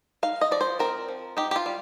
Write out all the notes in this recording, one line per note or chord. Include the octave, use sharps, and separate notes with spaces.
D#4 F5
D#5
F3 D5
C5
C4 A#4
F3
D#4 G4
G4
F4
G3